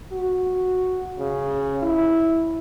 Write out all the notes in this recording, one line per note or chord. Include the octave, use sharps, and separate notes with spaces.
F#4
C#3
E4